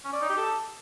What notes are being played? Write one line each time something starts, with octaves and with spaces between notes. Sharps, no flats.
C#4
D5
D#4
G4
A4